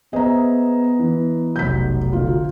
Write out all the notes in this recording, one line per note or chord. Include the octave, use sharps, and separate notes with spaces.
B3 G#4 C5 D#5 E5 A#5
E3
F1 B1 G6 B6
D2 F4